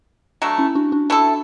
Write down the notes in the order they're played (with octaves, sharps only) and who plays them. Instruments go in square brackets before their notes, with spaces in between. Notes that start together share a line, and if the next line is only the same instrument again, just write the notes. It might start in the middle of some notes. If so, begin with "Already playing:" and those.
[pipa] F#3 A3 D4
[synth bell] C#4 E4
D4 F#4
D4 F#4
[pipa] A3 E4 A4